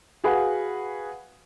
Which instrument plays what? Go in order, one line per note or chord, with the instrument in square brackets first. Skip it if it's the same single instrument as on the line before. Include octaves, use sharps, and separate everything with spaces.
[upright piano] F#4 G#4 B4 F5 F#5